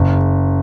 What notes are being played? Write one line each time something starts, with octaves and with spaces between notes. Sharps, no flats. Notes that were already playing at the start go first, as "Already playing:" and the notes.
Already playing: F#1 C#3